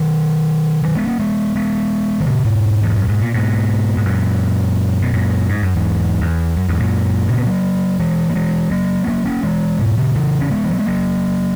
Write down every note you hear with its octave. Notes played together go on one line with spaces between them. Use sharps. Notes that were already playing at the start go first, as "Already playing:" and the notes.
Already playing: B2 D#3
D#3 F#3
G#3 B3
A#3 C#4
G#3 B3
G#3 B3
D#3
A#2 C#3
G#2 B2
E2
F#2
G#2
A#2
G#2 B2
G#2
F#2 A#2
B2
F#2 A#2
G#2
F#2
E2 G#2
E2
F#2
E2 G#2
F#2 A#2
A#2 C#3
B3
F#3 A#3
E3 G#3
A#3
E3 G#3
F#3 A#3
B3
F#3 A#3
A#3 C#4
E3 G#3
G#2 B2
A#2 C#3
C#3 E3
C#4
G#3 B3
E3
F#3
G#3
F#3 A#3